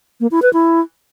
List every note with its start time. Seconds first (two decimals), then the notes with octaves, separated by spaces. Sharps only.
0.20 A#3
0.31 E4
0.42 B4
0.53 E4